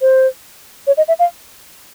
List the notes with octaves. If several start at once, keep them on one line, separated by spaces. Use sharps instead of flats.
C5
C#5
D#5
E5
F5